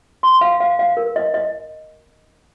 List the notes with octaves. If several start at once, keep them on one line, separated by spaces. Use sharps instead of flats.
C6
F5
F5
F5
A#4
D#5
D#5